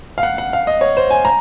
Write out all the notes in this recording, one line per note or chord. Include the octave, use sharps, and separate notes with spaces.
F5
F#5
F#5
F5
D#5
C#5
C5
G#5
A#5